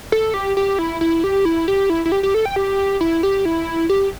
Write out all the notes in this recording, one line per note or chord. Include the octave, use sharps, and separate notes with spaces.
A4
G4
G4
E4
E4
G4
E4
G4
E4
E4
G4
G4
A4
G5
G4
E4
G4
E4
G4